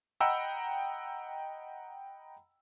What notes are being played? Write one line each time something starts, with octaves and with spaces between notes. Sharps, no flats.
D#5 F#5 G5 A#5 B5 E6